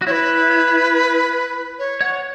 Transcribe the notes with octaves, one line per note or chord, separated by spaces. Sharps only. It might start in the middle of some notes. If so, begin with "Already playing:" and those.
F#4
E4 B4 C#5
C#5
C#5 F#5